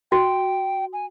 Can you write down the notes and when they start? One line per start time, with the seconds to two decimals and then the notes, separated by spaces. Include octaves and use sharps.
0.11 F#4 G5
0.93 G#5